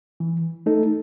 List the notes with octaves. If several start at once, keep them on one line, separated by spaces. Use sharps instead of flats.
E3
A3 D#4 A4